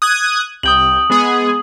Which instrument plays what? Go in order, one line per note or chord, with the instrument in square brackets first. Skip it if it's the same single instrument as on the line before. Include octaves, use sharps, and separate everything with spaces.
[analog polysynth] D#6 F#6 G#6
[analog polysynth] C2 G5 [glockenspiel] D#6 F#7
[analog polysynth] G#3 B3 G#4